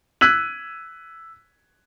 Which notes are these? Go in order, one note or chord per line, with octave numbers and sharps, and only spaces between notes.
E6 F#6 G#6 B6 D#7 F#7